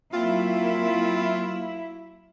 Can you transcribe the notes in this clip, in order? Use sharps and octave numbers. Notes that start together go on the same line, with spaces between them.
F#3 A#3 C4 E4 F4